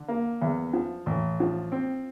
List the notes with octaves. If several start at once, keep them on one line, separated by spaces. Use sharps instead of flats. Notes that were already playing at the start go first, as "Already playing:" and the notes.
Already playing: D3
A#3
E2
F3
A1
F3
C4